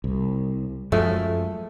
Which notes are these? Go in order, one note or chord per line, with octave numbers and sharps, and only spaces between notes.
C2
F#2 F3 G#3 A3